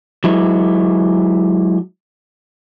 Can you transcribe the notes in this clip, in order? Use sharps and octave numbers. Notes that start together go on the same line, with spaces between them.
F#3 G#3 E4